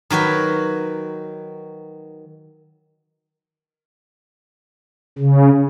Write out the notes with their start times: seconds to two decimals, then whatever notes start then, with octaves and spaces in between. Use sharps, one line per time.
0.10 D#3 F#3 F#4 B4
5.18 C#3